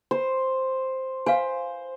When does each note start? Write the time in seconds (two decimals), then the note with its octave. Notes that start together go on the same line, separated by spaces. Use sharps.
0.11 C5
1.26 C5 F5 G#5